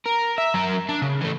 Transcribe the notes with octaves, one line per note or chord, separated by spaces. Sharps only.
A#4
E5
F#3 A#4
D4
C#3
E3 A3